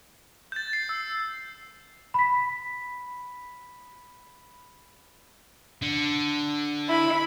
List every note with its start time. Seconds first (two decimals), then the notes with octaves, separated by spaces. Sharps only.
0.52 G6 A6
0.73 C7
0.89 E6
2.14 B5 B6
5.82 D3
6.89 E4 B5